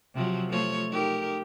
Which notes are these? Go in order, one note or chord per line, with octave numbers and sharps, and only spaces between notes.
C3 F3 F#3
F3 A3 C#5
D#4 G4 A#4